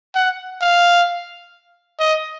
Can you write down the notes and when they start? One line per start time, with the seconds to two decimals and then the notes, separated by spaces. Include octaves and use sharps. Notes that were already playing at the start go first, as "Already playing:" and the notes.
0.15 F#5
0.61 F5
2.00 D#5